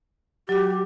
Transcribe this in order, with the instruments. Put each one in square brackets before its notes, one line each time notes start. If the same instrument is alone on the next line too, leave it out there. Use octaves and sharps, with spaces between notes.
[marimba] F#3 F#4 [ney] G4